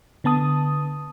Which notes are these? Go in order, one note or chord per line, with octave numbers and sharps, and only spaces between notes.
D3 B3 A5 D#6